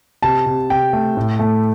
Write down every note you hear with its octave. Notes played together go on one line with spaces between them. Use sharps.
C3 A5
C3
C3 G5
A3
A2
A3